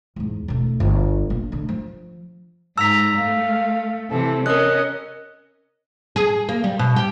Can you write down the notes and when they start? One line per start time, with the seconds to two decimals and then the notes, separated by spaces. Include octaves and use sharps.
0.16 E2 G#2
0.48 E1 A3
0.80 G1
1.30 A#1
1.52 D3 A3
1.69 F3
2.78 G#2 A#5 E6 B6
3.18 A3 F5
4.10 C3 E3 A4
4.46 C#4 A#4 D#5 F#6
6.16 G#4
6.49 A#3
6.64 G3
6.79 B2
6.96 G4